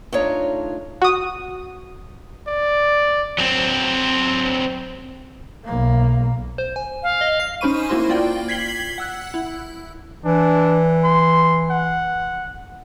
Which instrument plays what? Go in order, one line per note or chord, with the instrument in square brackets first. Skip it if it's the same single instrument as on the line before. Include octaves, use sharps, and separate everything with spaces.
[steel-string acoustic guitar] A3 D4 D#4 F4 C#5 A#5
[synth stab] F#4 D#6
[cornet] D5
[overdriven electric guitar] F#3 C4
[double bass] B1 A#3
[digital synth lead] C5
G#5
[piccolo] F5
[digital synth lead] D#5
C7
[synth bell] C#4 D#4 C5 B5 C#6 D#7
A#3 E4 F#4 C5 C6
A#3 F4 D5 G5
G#6 B6 C7 F#7 G7
F#5 E6 F#6
E4
[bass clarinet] E3 [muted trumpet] D4
[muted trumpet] C6
F#5